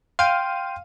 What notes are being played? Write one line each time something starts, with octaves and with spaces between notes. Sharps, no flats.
F5 G5 C6 D#7